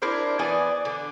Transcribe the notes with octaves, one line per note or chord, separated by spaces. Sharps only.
D4 E4 A#4 C5
E3 B3 D5 G#5
D3